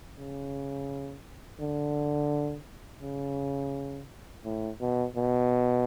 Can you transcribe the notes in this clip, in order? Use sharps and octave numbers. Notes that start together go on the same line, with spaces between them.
C#3
D3
C#3
A2
B2
B2